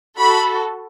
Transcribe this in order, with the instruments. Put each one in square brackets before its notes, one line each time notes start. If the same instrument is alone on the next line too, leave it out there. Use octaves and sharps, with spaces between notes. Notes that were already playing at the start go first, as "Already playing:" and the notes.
[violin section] F#4 A4 B5